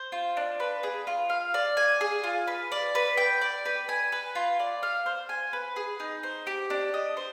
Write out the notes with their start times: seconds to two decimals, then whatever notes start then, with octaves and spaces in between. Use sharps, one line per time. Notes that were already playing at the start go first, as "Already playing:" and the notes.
Already playing: C5
0.12 F4
0.37 D4
0.60 B4
0.83 G#4
1.07 F4
1.30 F5
1.54 D5
1.77 G#5
2.01 G#4
2.24 F4
2.47 B4
2.72 D5
2.95 B4
3.17 G5
3.41 D5
3.66 B4
3.89 G#5
4.12 B4
4.35 F4
4.59 D5
4.83 F5
5.06 C5
5.29 G#5
5.53 B4
5.76 G#4
6.00 D#4
6.23 C5
6.47 G4
6.70 D4
6.94 D#5
7.17 C5